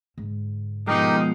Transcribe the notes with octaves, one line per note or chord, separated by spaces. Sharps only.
G#2 D3
B2 F3 G#3 D#4 G4 A#4